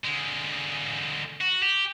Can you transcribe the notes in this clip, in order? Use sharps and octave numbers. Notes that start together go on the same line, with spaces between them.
D3 G#3
F#4
G4